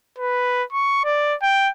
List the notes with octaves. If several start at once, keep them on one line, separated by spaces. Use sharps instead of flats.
B4
C#6
D5
G5